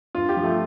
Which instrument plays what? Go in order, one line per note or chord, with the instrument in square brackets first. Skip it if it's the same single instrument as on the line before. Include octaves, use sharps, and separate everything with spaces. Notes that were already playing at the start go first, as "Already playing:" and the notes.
[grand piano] G2 F4
G4
F3
A3